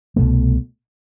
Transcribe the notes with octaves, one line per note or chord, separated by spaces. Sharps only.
C2 B2 F#3 A3